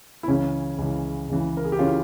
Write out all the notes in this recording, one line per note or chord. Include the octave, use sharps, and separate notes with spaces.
E4
C#2 C#3 E3 C#4
C#2 C#3 E3
C#2 C#3 E3
A#4
G#4
G4
C#3 E3 C#4 F4